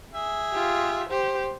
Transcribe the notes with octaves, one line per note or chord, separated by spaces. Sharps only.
G#4 E5
F4 G4
G4 C5